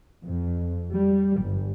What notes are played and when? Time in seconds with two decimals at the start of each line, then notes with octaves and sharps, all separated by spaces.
0.22 F2
0.93 G3
1.42 G1